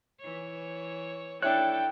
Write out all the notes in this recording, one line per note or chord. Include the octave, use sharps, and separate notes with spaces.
E3 C#5
D4 E4 A4 C#5 G5 F#6